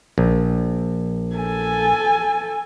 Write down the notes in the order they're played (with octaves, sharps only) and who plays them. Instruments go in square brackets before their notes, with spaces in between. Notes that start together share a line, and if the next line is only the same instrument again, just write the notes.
[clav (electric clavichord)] A#1
[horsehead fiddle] A4 G#5